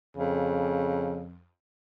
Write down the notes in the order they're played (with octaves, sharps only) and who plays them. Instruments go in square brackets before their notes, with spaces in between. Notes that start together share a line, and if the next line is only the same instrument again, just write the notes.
[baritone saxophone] F2 [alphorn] C#3